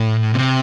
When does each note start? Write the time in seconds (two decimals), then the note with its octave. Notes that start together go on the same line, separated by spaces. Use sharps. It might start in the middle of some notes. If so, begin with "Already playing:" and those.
Already playing: A2
0.33 C3